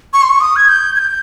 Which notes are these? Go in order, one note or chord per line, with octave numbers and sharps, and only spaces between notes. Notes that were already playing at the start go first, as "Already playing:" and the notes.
C#6
C6
C#6
D#6
G#6
G6
G#6
G6